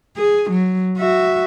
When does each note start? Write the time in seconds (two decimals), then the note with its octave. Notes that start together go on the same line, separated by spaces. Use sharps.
0.17 G#4
0.51 F#3
0.98 F#4 E5